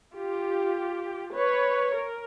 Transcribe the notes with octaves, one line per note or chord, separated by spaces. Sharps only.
F4 G4
B4 C#5
A#4